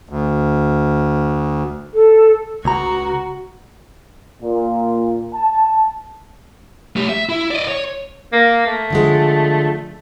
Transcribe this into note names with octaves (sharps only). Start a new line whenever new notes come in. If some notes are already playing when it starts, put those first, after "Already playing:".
D2
A4
C#2 F#4 A#5
A#2
A5
A3 G4
E5
E4
D5 D#5
C#5
A#3
A3
D3 F3 G#3